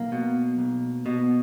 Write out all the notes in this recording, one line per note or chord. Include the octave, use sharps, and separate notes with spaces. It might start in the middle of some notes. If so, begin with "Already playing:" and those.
Already playing: B1 A#3
B2
B1
B2